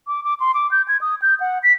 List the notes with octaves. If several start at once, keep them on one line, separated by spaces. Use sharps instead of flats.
D6
D6
C6
D6
G6
G#6
D#6
G6
F#5
B6